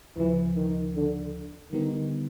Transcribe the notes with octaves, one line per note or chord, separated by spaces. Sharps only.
D2 C#3 E3 F3
D#3
D3
D3 D#3 G3 B3 D#4